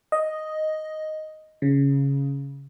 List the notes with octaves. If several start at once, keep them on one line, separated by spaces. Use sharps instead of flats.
D#5
C#3